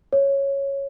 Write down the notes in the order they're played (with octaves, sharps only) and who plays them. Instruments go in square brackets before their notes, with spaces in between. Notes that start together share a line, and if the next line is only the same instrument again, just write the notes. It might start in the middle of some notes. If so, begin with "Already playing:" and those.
[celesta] C#5